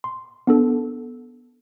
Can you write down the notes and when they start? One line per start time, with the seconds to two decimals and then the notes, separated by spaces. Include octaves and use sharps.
0.04 C6
0.47 B3 D4 A4